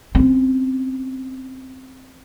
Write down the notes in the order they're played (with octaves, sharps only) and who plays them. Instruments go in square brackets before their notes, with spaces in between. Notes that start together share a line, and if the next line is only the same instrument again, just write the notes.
[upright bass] C4 C#4